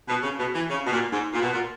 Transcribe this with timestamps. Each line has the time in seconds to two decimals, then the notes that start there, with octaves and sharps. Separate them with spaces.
0.08 B2
0.23 C#3
0.39 B2
0.54 E3
0.70 C#3
0.86 B2
0.91 A#2
1.12 G#2
1.34 A#2
1.42 B2
1.52 A#2